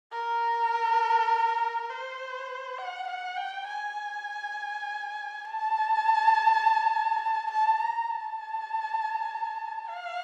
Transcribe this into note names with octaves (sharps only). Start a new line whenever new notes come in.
A#4
C5
F#5
F#5
G5
G#5
A5
A5
A5
A#5
A5
F5